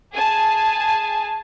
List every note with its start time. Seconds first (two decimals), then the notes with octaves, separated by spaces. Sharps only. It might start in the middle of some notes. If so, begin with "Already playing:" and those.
0.12 G#4 G#5 A5